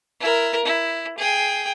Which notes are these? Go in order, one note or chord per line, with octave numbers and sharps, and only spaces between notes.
E4 A#4
E4
G#4 G5